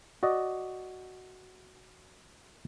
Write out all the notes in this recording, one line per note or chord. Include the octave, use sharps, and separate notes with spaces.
F#4 D5 D#5